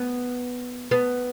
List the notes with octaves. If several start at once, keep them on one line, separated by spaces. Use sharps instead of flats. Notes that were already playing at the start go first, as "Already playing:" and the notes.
Already playing: B3
B3